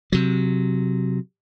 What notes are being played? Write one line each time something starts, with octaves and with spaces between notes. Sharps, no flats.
C3 F#3